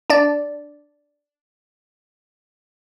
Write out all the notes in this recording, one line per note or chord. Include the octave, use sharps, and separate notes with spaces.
D4 D5